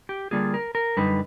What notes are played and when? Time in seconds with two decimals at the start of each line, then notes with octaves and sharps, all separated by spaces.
0.09 G4
0.31 D3 G3 A#3 D4 F4 G#4
0.54 A#4
0.75 A#4
0.97 F#2 D3 G3 D#4 B4